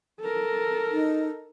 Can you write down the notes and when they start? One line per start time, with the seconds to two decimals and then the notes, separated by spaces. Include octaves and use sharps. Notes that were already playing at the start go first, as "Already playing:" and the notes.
0.21 A4 A#4
0.92 D#4